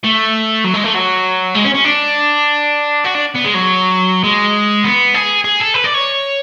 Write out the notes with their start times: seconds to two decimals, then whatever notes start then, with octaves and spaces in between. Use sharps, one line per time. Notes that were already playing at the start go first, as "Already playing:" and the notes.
0.04 A3
0.65 F#3
0.74 G#3
0.84 A3
0.94 F#3
1.54 G#3
1.64 C#4
1.74 C#4
1.84 D4
3.04 F#4
3.14 D4
3.35 B3
3.44 G#3
3.54 F#3
4.24 G#3
4.84 B3
5.15 G#4
5.44 G#4
5.60 A4
5.74 B4
5.84 D5
5.94 C#5